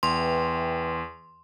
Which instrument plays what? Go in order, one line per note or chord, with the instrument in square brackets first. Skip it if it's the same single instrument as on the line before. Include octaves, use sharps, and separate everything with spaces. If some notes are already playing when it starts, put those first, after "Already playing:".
[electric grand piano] E2 [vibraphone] B4 E5 G5 [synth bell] C6